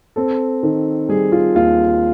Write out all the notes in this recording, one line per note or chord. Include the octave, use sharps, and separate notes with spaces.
C4 A4
D#3
G3 G#4
F4
D#2 F4